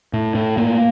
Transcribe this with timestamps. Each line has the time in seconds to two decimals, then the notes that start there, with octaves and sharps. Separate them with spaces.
0.13 A2
0.35 A2
0.57 A2 A#3